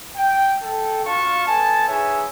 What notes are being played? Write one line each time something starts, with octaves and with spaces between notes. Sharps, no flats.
G5
A4 G5
D4 F4 F#4 F5 A5 C#6
B3 A4 G#5 A5
D#4 G#4 B4 C#5 E5 G#5